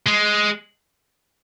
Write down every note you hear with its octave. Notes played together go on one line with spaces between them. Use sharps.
G#3